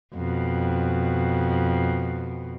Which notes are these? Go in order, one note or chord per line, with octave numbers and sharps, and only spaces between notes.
F2 B2